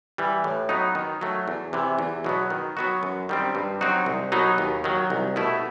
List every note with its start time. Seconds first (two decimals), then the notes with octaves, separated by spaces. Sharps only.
0.18 E3 G3
0.44 A2
0.69 F#3 B3 D#4
0.95 D#3
1.21 F#3 A3
1.48 E2
1.73 C3 E3
1.99 E2
2.24 B2 F#3 B3
2.50 D#3
2.77 F#3 B3 F#4
3.03 F#2
3.29 D#3 G3 C4
3.55 G2
3.81 F#3 C4 D#4 F#4
4.06 C2
4.32 B2 F#3 B3 D#4
4.58 D#2
4.84 D#3 F#3
5.10 C2
5.36 B2 A3 E4